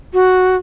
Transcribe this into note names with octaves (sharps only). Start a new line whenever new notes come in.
F#4